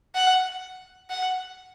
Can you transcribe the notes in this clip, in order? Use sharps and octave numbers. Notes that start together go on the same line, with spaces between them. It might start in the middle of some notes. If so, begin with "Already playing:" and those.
F#5
F#5